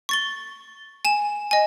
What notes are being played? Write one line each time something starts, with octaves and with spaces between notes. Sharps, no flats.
C#6 A6 G7
G#5 E7
D#5 G#5